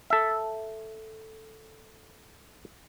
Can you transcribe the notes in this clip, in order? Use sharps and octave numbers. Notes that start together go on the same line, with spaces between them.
A4 E5